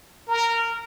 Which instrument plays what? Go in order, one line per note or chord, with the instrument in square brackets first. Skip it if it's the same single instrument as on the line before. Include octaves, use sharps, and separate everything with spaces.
[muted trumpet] A#4